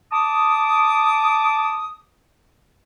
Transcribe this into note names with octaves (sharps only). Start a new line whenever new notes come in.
A5 D6 D#6